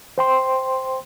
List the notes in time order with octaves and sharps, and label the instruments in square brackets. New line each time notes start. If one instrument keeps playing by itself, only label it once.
[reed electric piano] C5 G5 C6